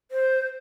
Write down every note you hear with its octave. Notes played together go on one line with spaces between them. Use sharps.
C5